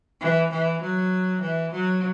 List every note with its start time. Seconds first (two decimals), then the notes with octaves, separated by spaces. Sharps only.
0.21 E3
0.50 E3
0.81 F#3
1.42 E3
1.72 F#3